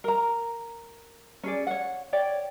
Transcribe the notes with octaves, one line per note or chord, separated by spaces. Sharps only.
A#4 A#5
C#4 G#4 D5
C#5 F#5
C#5 D5 G5